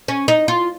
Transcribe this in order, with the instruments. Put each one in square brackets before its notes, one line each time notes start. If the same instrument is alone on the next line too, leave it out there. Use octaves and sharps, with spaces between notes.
[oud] C#4
D#4
F4